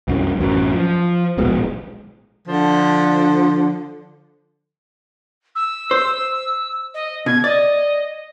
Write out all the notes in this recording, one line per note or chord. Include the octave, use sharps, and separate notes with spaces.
C2 F#2
A1 F#2
F3
D1 A#1 B2 G#3
D3 F3
E6
C5
D#5
B2 G#6
D5 D#5